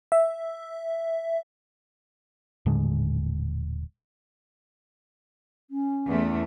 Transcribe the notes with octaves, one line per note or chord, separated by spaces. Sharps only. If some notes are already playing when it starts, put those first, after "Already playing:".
E5
D#1 A2 D3 G#3
C#4
E2 A3